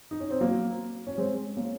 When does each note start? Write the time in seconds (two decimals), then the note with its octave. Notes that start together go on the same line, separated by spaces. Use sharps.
0.11 D#4
0.20 C#4
0.31 C4
0.40 F#3 A#3
1.07 C#4
1.18 G#3 C4
1.56 A#3 C#4